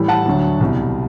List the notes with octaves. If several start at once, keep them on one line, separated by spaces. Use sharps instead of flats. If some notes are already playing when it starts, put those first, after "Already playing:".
Already playing: A2 E3 G3
F#5 A5
D2 D3 F#3
C2 B2 G3